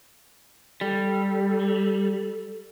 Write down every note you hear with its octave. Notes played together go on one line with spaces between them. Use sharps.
G3 A4